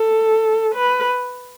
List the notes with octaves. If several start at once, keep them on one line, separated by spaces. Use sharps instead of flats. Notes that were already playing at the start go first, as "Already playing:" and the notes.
Already playing: A4
B4